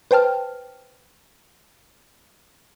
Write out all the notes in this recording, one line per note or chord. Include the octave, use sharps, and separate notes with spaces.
B4 C5 G5 A5 F6